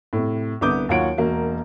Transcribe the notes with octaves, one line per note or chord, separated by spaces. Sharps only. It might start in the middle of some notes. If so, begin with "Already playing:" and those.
A2 C3
C2 D3 B3 D6 D#6 G6
D#2 F#3 F4 C#5 F#5 D7
E1 A#3 F#4